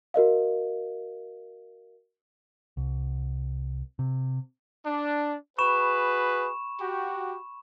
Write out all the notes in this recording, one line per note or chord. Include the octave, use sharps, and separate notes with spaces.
F#4 A#4 D#5 F5
C2
C3
D4
F#4 G#4 B4 B5 C#6 E7
F#4 G4